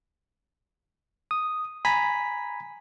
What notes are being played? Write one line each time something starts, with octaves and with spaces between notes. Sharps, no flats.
D#6
G#5 A#5 B5 B6